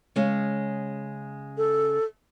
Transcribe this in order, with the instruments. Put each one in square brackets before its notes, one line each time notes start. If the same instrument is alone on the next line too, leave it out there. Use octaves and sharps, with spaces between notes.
[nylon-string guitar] C#3 G#3 C#4
[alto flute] A4